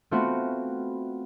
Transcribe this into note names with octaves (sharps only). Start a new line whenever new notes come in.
A3 B3 C4 F4 F#4